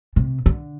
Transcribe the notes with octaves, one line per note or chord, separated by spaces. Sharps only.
C3
D3